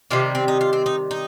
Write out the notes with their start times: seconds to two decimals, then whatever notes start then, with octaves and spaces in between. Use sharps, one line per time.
0.10 C3 D#3 G3 A#3 F4
0.35 C4
0.48 D#4
0.61 F4
0.73 C4
0.86 D#4
1.11 D#4